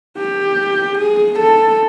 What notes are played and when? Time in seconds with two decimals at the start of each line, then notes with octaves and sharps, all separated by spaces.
0.17 G4
0.98 G#4
1.39 A4